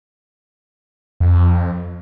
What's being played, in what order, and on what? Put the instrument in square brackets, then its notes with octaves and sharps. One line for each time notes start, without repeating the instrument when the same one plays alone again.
[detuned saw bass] F2